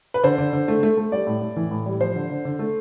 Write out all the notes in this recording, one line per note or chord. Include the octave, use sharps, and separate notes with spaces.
B4
D3 C5
D3
D3
A3
A3
A3
G3 D5
A2
A2
E3
A2
G3
F3 C5
D3
D3
D3
A3